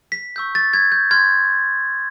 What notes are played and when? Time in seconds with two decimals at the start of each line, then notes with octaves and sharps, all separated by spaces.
0.12 B6
0.36 C#6 E6 G6
0.55 A6
0.73 G#6
0.92 G6
1.11 C6 F6 G#6